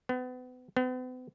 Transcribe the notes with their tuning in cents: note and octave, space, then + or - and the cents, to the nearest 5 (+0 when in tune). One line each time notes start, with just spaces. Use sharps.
B3 +35
B3 +45